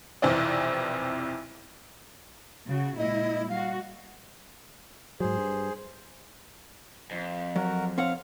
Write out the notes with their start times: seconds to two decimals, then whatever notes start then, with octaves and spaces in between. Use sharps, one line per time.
0.22 B1 F2 C3 E3 C4 D5
2.69 C#3 F#4
2.98 A#2 G#3 E4 D#5
3.50 G3 F#4 F5
5.20 G#2 F#3 G#4 C5
5.38 G2
7.11 F2
7.56 F#3 F#4 A#4
7.98 C4 C#5 F5 F#5